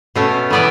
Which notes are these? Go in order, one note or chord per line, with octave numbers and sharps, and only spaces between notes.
B2 A3 C#4
E3 B3 E4 B4 D5